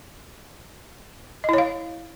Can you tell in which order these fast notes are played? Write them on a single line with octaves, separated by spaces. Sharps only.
D#5 E4 C#5 F5